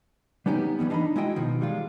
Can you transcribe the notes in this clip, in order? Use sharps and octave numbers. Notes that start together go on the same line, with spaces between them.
G3 B3 C#4 D#4 G4
E3 F3 G3 B3
D4 D#4 D#5 A#5 B5
G#3 E4 F#4 D#5 G5
B2 D#3 F3
G3 G#3 F4